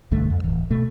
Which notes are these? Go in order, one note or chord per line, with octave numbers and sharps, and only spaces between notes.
B1 G2 D3 A3
F2
D1 E3
B2 A3